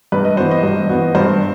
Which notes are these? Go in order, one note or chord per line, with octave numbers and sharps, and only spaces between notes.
G2 B4
D#5
E3 B3 F#4 C5
D#5
G2
E3 B3 F#4
G2 C5